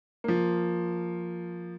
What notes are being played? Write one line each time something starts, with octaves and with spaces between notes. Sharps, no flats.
F3 A#3